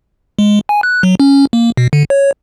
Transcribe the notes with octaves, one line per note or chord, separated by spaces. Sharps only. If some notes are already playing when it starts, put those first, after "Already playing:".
G#3
G#5
F#6
F#3
C#4
A#3
B2
D3
C#5